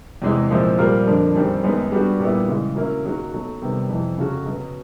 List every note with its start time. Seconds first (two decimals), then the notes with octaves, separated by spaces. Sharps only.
0.22 E2 C3 E3 G#3
0.50 A#2 F3 G#3 C4 E4
0.78 A#2 G3 C4 F4 A#4
1.06 F2 D3 F3 A#3 D4
1.35 F#2 D#3 G3 C4
1.64 F#2 D#3 G#3 B3
1.92 G3 B3 D4 F#4
2.20 A#2 G3 B3 E4
2.48 C#3 E3 G#3
2.76 F#3 A#3 C#4 E4
3.04 D#3 F#3 A#3 D#4 F#4
3.32 B2 F#3 A3
3.62 C3 D#3 G3 B3
3.89 F2 C3 E3
4.18 C#3 F#3 A3 C#4 F#4
4.46 B2 F#3 B3